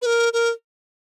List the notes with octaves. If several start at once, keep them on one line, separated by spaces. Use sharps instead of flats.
B4
A#4
A#4